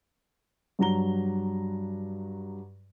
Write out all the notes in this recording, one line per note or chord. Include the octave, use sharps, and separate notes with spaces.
G2 F#3 A#5 G7